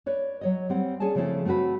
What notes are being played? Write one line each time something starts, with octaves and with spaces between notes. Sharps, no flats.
B4 C#5 D5
F#3 C#5 D#5
G3 C4 F#5
C#4 G#4 D5 G#5 A5
C#3 F3 A3 C4 E4 A4
A3 C4 F4 F#4 B4